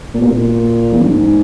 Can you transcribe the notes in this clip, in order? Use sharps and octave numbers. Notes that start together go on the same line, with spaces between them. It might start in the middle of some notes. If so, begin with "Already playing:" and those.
A#2
B2
A#2
E2
F#2
G#2